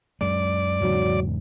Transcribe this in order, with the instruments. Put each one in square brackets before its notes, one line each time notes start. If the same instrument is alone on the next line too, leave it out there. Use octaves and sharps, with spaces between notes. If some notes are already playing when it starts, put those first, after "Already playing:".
[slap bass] F#2 G#3 [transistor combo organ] D5
[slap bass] E2 G#2 C#3 [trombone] F#3